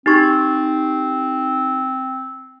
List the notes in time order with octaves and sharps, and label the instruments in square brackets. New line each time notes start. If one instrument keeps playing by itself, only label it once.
[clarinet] C4 [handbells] D#4 G4 C#6